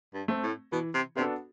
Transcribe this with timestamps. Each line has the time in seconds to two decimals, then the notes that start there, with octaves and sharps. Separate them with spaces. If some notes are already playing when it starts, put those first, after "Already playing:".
0.14 G2
0.28 A3 C4
0.43 A2
0.72 B2 E3
0.94 C3
1.17 C3 B3 D4 F#4 A4